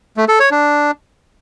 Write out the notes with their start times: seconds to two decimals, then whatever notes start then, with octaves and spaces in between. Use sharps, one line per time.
0.17 A3
0.28 A4
0.40 C#5
0.51 D4